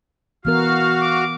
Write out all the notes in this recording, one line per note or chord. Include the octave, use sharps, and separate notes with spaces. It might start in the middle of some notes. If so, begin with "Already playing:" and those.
E3 B3 F#4 A#4 F5 F6
D6